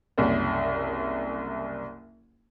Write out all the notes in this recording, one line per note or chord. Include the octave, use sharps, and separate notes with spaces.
F#1 C2